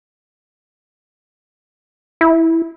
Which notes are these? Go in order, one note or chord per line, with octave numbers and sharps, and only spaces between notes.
E4